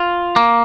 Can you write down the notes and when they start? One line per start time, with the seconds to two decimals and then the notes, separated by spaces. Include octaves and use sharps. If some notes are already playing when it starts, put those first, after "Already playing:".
Already playing: F4
0.36 A#3